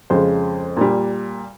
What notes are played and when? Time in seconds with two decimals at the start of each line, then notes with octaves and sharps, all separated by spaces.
0.10 F2 C#3 G#3 C5
0.77 A#2 G3